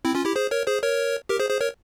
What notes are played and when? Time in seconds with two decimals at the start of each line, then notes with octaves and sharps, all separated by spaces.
0.05 C4 E4
0.15 C#4 F4
0.25 E4 G4
0.36 G#4 C5
0.51 A#4 C#5
0.67 G#4 C5
0.83 A#4 C#5
1.29 G4 A#4
1.39 G#4 C5
1.50 G#4 C5
1.61 A#4 C#5